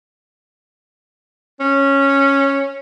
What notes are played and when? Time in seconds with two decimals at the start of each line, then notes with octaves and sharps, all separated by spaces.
1.60 C#4